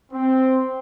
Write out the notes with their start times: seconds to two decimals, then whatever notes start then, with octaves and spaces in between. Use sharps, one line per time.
0.12 C4